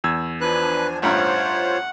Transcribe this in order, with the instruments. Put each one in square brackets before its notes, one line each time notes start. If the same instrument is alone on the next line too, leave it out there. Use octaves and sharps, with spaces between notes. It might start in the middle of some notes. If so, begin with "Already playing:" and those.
[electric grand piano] E2 E6 G#6
[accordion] F3 D4 G#5 [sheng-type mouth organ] B4 F#6
[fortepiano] A1 G2 A#5 [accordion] F4 C5 C#5 [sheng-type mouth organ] F#5